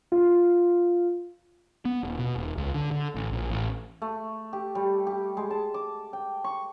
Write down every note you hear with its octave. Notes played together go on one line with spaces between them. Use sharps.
F4
B3
D#1
B2
D#1
C#2
D3
D3
A1
A#1
A1
A3
G4
G3
G4
G#3
A5
D6
G5
C#6